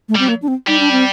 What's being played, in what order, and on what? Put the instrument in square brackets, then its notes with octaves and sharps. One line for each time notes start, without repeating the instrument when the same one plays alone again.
[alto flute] A3
[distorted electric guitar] G3
[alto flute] C4
A#3
D4
C4
[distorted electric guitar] G3 [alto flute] D#4
[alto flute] D4
C4